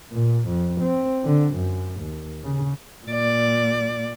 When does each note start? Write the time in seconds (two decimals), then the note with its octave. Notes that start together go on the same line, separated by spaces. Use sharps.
0.12 A#2
0.48 F2
0.82 C4
1.25 D3
1.55 F#2
2.01 D#2
2.44 C#3
3.07 A#2 D5